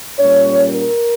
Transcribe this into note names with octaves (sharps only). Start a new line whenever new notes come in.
A#2 G3 C#4 C#5
A#4